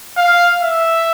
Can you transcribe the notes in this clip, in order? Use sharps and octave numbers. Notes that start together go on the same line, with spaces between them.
F5
E5